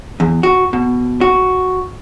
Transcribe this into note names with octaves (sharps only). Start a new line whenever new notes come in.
E2
F#4
B2
F#4